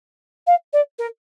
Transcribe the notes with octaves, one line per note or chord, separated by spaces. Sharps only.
F5
D5
A#4